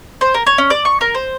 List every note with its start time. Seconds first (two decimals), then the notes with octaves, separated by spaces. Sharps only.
0.21 C5
0.34 A#4
0.47 C#5
0.58 C#4
0.70 D5
0.85 C#6
1.01 A#4
1.15 C5